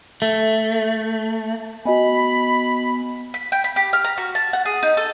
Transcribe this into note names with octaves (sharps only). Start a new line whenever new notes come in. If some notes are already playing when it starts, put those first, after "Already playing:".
A3
B3 F#4 D#5 G#5 B5
B5
G5
B5
G4
F6
A#5
F#4
A5
F#5
G#4
D#4
A4